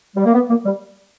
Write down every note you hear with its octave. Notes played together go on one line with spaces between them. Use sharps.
G3
A#3
B3
A#3
G3